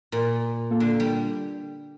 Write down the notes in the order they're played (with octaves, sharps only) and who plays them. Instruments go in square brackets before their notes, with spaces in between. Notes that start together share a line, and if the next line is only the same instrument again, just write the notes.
[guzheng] A#2 [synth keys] A#3 F4 A#4
[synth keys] A#3 F4 A4
[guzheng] D3
G3